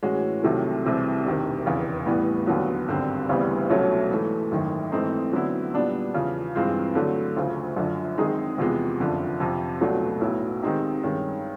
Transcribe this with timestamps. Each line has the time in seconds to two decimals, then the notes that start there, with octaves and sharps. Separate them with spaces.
0.03 A2 E3 G#3 C#4 F#4
0.43 C2 C3 D#3 F#3 A3
0.84 C2 C3 E3 G#3 C4
1.25 E1 D2 C3 D#3
1.66 F1 E2 C#3
2.06 A2 E3 G3 B3
2.47 D#2 D3 F#3 B3
2.88 G#1 G2 D3 G3 C4
3.29 D2 C#3 E3 G3 B3
3.69 C2 B2 F#3 A3 C#4
4.10 G#2 E3 A3
4.51 G#1 F#2 D#3
4.92 G#2 E3 A3 C4 D#4
5.33 D3 F#3 B3 E4
5.73 A#2 G3 B3 D4
6.14 E2 C#3 F3
6.55 G2 E3 G#3 C4 F4
6.95 D3 F#3 A3
7.36 D2 C#3 F3
7.77 F#2 D3 F3
8.18 D#3 G#3 C4 D#4 G#4
8.58 E2 C3 F3 G#3 B3
8.99 F#1 F2 D3 F3
9.40 F2 C3 F3
9.81 C#2 B2 F#3 A3 D4
10.21 B1 A2 F#3 B3 E4
10.62 D#3 G#3 C4 D#4 G4
11.03 G2 D#3 G#3 C#4